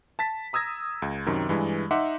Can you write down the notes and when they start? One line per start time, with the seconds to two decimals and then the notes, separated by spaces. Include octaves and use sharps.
0.19 A5 A6 B6
0.53 A#5 D#6 E6 G#6 A#6
1.02 C#2
1.26 F#2 C3 D#3
1.49 G2 E3 G#3
1.91 D#4 E5 F#5 C6 D6